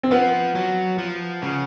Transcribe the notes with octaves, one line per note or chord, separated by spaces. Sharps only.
C4
F3 B3
F#3
F3
C#3